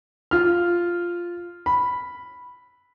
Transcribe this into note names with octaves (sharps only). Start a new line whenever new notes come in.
F4 F6
B5